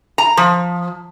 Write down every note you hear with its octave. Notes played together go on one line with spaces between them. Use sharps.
A#5
F3